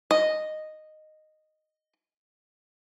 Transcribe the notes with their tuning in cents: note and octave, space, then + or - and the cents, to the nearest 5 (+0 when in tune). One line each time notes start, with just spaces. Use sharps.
D#5 -5